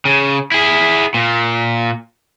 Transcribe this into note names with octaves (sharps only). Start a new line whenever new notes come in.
C#3
E4 G#4
A#2